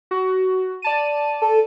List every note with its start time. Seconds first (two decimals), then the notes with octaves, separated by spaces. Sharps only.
0.11 F#4
0.82 D5 A5 D#7
1.42 A4